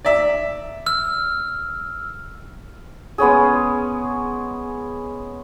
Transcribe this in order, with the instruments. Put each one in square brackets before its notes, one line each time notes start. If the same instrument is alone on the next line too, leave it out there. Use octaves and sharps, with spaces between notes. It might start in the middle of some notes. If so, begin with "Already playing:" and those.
[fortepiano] D5 E5
[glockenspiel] E6 F6
[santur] G#3 B3 C#4 G#4